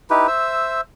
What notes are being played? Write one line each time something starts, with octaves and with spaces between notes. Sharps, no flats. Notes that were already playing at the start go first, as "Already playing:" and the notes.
D#4 E4 G4 B4
C5 E5 E6